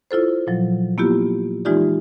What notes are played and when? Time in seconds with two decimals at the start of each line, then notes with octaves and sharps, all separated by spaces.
0.11 E4 F4 A4 C5
0.47 A#2 F3 F#3
0.98 A#3 B3 E4 F4 G4
1.65 E3 G#3 D#4 F4 G4 D5